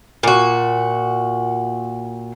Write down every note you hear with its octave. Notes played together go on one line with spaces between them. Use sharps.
A#2 F#4